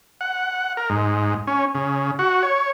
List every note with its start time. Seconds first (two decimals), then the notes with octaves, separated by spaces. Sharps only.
0.21 F#5
0.77 A#4
0.90 G#2
1.47 C#4
1.75 C#3
2.19 F#4
2.43 C#5